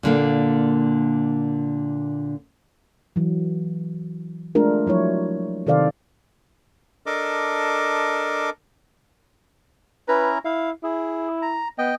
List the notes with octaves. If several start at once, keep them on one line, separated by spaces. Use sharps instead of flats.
A#2 D3 A#3
E3 F#3
G#3 A3 D4 F4 A#4
F3 F#3 E4 C#5
C3 D#3 A4 C5 D5 F5
D4 A4 A#4 D#5 D6
C#4 E4 B4 A#5
E4 F5
E4 G#4
A#5
B3 D#5 G5